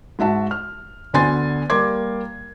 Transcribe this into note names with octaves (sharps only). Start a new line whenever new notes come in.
G#2 F#4 E5 A5
F6
D2 D3 B3 G#5 C6 A6
G3 A#3 C6 D6 G#6